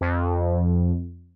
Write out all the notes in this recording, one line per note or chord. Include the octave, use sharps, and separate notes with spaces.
F2